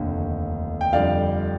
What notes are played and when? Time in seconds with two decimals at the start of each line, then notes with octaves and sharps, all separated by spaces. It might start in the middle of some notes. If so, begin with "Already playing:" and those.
Already playing: F1 D#2 D3
0.81 G5
0.92 F2 D3 G3 D5 F5